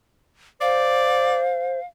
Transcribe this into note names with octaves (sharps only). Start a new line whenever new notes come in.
C5 D5 F5